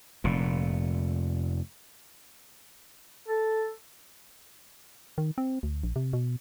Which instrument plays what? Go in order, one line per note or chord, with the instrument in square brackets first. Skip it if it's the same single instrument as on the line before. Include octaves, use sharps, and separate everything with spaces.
[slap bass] F1 A#2
[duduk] A4
[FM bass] D#3
C4
D2
A#1
C3
B2